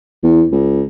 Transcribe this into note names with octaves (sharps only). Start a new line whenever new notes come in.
E2
C#2